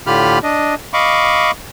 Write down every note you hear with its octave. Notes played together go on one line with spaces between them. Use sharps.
A2 D3 F4 G4 B5 F6
D4 D#5
D#5 F5 B5 C#6 D6